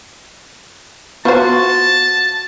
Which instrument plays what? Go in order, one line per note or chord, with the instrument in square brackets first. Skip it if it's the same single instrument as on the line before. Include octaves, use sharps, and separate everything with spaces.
[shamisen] F3 C5 [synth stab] B3 F4 [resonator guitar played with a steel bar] F#4 [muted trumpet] A5